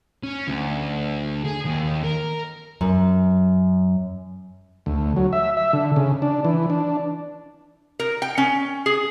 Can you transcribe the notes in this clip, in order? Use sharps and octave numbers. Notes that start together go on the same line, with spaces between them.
C#4
D2
G#4
D#2
A#4
F#2
D2
F#3
E5
E5
D3
C#3
D4
E3
D4
A#4
G5
C#4
G#4